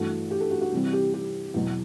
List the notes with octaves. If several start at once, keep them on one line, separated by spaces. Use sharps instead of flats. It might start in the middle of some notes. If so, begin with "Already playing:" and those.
Already playing: G2 E3 A3 F#4
G4
A4
F#4
F#4
C3 E3 G3 C4
G4
G4
E2 B2 F#3